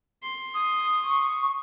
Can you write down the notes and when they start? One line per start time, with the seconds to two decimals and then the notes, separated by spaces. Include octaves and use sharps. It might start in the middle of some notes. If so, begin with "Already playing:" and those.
0.23 C6
0.54 D#6
1.04 C#6